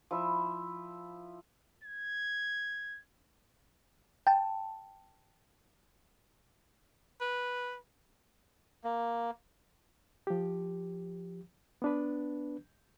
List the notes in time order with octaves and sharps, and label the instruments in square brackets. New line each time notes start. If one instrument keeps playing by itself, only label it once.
[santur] F3 E4 E5
[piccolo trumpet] G#6
[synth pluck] G5 A5
[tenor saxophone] B4
[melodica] A#3
[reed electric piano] F3 G4
B3 D4 B4